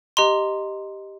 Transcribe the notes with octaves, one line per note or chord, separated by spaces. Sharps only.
G4 D#5 A#5 C6